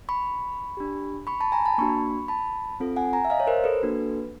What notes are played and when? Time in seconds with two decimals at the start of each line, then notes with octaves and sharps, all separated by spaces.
0.09 B5 C#6
0.77 D4 G4
1.27 B5 C#6
1.41 A5 B5
1.52 G#5 A#5
1.65 A5 B5
1.78 A#3 D4 F#4 B5 C#6
2.28 A5 B5
2.80 C4 F4 A4
2.96 F#5 G#5
3.13 G#5 A#5
3.25 E5
3.30 D#5 F5
3.40 C#5
3.47 A#4 C5
3.64 A4 B4
3.81 A#3 D4 F#4 A4